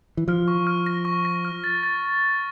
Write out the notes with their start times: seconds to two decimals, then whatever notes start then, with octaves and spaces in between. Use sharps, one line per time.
0.17 E3
0.28 F3 F6
0.48 C#6
0.67 F6
0.86 A#6
1.05 C#6
1.25 A#6
1.45 F6
1.64 A6
1.83 A6